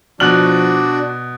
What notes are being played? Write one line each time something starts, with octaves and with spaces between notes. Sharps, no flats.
B2 F3 D4 F#4 D5 F6 F#6 F#7